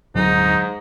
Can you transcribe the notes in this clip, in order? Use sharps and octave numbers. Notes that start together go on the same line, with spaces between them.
G1 D2 G#2 F#3 D#4